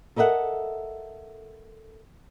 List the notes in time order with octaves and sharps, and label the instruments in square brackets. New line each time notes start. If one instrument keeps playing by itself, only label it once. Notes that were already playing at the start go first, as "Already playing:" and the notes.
[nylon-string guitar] A4 A#4 D#5 E5 F#5